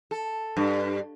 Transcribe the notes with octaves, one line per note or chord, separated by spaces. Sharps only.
A4
G2